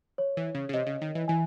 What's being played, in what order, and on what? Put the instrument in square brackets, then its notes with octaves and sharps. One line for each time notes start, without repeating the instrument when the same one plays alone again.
[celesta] C#5
[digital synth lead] E3
C#3
C#3
[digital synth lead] C3 [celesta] D#5
[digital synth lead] C#3
D#3
E3
[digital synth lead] E3 [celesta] G#5